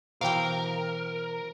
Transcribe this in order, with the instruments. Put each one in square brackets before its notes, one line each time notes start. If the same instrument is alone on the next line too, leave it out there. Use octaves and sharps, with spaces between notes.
[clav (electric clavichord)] B2 E3 [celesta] F#4 C5 [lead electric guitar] A#4 [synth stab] F5 G5